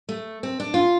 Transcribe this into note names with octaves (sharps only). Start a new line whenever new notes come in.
A3
C4
D4
F4